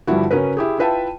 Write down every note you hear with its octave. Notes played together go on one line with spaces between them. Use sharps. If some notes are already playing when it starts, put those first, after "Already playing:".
G2 D3 F3 G3 E4 F#4
C#3 C#4 F#4 A#4 B4
E4 G4 G#4
E4 F4 B4 E5 G5 A5